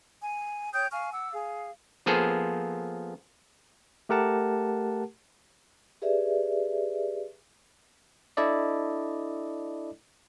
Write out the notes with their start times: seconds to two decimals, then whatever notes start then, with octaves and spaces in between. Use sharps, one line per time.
0.23 G#5
0.73 C#5 G5 D#6 G6
0.91 F5 G#5 C#6 F6
1.12 F#5 D6 E6
1.33 G#4 F5
2.06 F3 A#3 B3 G#4 A4 C5
4.09 A3 G4 A#4 F#5 A5
6.02 G4 G#4 B4 D5 E5
8.37 D4 E4 A4 D5 D#5